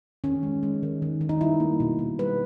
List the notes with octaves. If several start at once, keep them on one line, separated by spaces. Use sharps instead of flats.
D#3 C#4
G#3
G#3
D#3
D#3
D#3
D#4
G3 E4
A#3
B2
B2
G3 B4